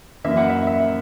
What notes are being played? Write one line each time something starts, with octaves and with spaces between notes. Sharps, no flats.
F#2 E3 A#3 E5
F#5
E5
E5